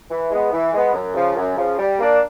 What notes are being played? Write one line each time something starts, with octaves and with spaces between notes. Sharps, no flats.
E3
G#3 B3
E3
G#3 B3
F#2
C#3 F3
F#2
C#3 F3
G3
A#3 D4